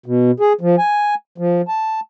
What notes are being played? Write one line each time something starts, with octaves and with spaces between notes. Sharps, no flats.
B2
G#4
F3
G#5
F3
A5